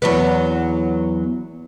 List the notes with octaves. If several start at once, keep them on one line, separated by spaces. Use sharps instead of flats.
E2 F#3 B3